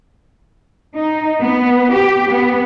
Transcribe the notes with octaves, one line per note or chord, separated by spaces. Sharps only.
D#4
B3
G4
B3